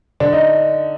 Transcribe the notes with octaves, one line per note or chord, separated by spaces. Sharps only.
D3 D4
D#4